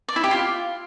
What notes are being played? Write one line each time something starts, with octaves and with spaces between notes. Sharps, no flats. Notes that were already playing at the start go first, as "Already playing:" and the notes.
D5
E4
G4
F4